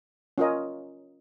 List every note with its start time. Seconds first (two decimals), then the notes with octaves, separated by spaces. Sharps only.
0.38 C#4 F4 A#4 D#5